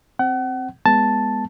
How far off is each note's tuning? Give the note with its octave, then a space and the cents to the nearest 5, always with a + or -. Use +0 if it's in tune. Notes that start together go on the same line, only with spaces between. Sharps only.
C4 +0 F#5 +35
G#3 +0 B3 +0 A5 +0